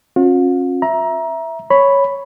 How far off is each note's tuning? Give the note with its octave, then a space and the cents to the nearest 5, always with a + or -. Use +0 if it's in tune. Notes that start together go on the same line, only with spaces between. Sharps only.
C#4 -40 F4 +45
E5 +0 A#5 +20
C#5 +0 B5 +0